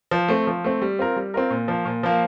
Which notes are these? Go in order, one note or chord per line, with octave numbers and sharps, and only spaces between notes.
F3
A3 C4
F3
A3 C4
G3
C4 F4 A#4
G3
C4 F4 A#4
A#2
F3 A#3
A#2
F3 A#3